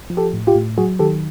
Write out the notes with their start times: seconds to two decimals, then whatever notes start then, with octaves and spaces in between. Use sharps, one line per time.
0.10 F3
0.17 G4 A4
0.33 A2
0.47 F4 G4
0.55 A2
0.78 F#3 F#4 G#4
0.99 D#3 G4 A4